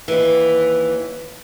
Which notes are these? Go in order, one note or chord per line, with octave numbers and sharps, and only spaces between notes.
D#2 E3